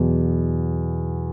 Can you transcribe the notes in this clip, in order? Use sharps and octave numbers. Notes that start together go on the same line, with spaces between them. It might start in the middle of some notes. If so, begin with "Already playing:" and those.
Already playing: E2 B2 F#3